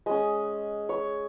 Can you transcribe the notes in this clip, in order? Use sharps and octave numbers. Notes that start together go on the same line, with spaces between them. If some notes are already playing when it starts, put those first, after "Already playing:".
G#3 C#4 D#5
C#5